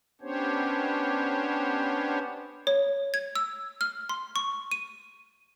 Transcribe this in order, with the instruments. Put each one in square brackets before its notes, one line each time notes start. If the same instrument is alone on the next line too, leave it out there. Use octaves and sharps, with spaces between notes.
[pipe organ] B3 C#4 D4 G4 C5 C#5
[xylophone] C#5
G#6
E6
F6
C6
C#6
D#7